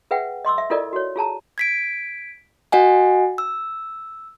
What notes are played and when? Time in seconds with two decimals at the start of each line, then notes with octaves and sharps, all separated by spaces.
0.11 G#4 B4 E5 F#5 G5
0.45 D#5 C6 D6 E6
0.58 E5
0.70 E4 F4 A4 A#4 D5 D#5
0.93 F#4 C#5
1.16 F4 G#4 A5 A#5
1.58 G#6 B6 D7
2.72 F#4 D#5 F#5 G#5
3.38 E6